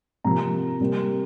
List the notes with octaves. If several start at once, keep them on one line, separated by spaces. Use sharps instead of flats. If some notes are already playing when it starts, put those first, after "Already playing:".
C3 F3 A#3 A#5
C3 G3 A#3